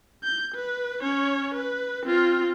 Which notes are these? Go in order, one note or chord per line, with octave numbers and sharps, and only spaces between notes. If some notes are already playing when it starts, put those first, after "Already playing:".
G6
B4
C#4 C#5
B4
C4 F4